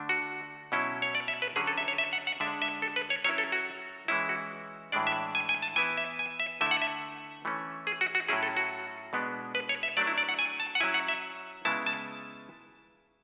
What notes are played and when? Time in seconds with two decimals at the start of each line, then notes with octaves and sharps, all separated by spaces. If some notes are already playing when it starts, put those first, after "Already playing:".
Already playing: D3 A3 D4
0.09 F#4
0.72 B2 F#3 C#4 E4
1.02 C#5
1.15 D5
1.28 E5
1.42 B4
1.56 D3 F#3 C#4 G#4
1.67 A4
1.78 E5
1.88 C#5
1.98 E5
2.13 F#5
2.27 F#5
2.40 D3 G#3 D4 E5
2.62 E5
2.82 A4
2.96 B4
3.10 C#5
3.24 F#3 C#4 E4 C#5
3.38 A4
3.52 F#4
4.08 E3 G#3 C#4 E4
4.29 F#4
4.92 A2 E3 G#3 D4 D5
5.07 E5
5.35 G#5
5.49 G#5
5.62 A5
5.76 E3 B3 E4 G#5
5.97 E5
6.19 G#5
6.40 E5
6.61 D3 A3 E4 E5
6.71 F#5
6.82 E5
7.45 E3 A3 C#4
7.87 G#4
8.01 F#4
8.15 F#4
8.28 A2 F#3 C#4 E4 G#4
8.43 A4
8.57 F#4
9.13 B2 G#3 B3 D4
9.55 B4
9.69 C#5
9.83 E5
9.97 F#3 A3 D4 D5
10.07 E4
10.18 D5
10.29 F#5
10.39 G#5
10.60 A5
10.75 F#5
10.80 F#3 C#4 E4 G#5
10.94 F#5
11.08 E5
11.65 C#3 G#3 B3 E4 A5
11.86 A5